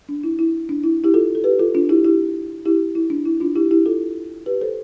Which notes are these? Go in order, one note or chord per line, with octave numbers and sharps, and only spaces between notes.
D4
E4
E4
D4
E4
E4 G4
F4 A4
A4
G4 B4
F4 A4
D4 F4
E4 G4
E4 G4
E4 G4
E4
D4
E4
D4 F4
E4 G4
E4 G4
F4 A4
G4 B4
A4 C5